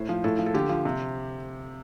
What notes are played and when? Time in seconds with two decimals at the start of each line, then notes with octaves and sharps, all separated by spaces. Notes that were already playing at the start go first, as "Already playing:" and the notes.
Already playing: A2 C5
0.09 F3
0.24 A2 A4
0.39 F3
0.46 A4
0.54 D3 G4
0.69 F3
0.85 C3